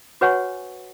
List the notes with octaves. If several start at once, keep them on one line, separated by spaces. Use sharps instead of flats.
F#4 B4 C#5 F#5 G#5 C#6